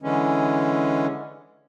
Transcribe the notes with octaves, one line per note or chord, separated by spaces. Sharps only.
D3 E3 G#3 C#4